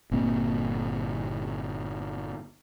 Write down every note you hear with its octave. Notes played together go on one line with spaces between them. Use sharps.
G1 A#2 A#3 C4